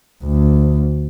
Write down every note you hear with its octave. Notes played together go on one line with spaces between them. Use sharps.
D2